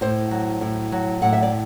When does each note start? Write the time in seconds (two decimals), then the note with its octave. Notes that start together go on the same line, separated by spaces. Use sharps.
0.01 A2 C5
0.31 F#3
0.61 A2
0.92 F#3
1.22 A2 F#5
1.33 E5
1.42 D5